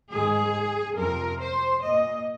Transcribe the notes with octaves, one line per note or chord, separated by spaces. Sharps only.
G#2 D#3 G#3 G#4
F2 C3 F3 A#4
C5
A#2 A#3 D#5